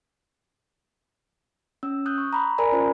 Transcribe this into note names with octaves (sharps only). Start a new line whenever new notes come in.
C#4 E6
D#6 F#6 G6
C#6
A#5 B5
A#4 D5 G#5 A#5 B5
C#4 F4 C5 B5